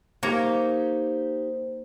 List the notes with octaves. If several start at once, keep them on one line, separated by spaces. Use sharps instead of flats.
A#3 D#4 G4 C5 C#5 A#5